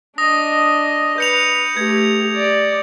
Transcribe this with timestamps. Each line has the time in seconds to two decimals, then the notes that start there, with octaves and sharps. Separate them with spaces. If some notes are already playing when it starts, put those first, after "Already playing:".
0.18 D4 D#5 D#6 A#6
1.18 B4 G6 C#7 F7
1.77 A3 G4 G#6
2.36 D5